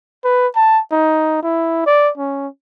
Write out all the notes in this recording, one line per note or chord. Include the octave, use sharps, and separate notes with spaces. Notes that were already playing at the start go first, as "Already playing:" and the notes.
B4
A5
D#4
E4
D5
C#4